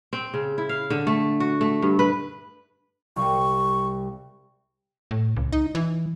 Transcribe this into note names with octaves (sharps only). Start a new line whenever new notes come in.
C4
C#3
E4
F5
D3
A3
F#4
A3
G2
B4
C2 F5 C#6
A2
C#2
D#4
E3